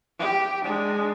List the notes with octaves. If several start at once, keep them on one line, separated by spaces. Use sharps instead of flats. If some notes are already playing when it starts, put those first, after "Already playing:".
G4
G#3 D4